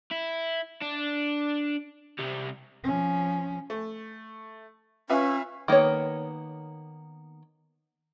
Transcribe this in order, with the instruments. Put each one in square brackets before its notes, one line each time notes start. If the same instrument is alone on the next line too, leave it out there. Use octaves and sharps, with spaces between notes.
[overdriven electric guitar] E4
D4
C2 G3
[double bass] F3 C#4
[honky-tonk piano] A3
[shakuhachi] C#4 [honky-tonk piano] F4 B4 E5
[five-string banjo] D#3 A#3 B3 C#5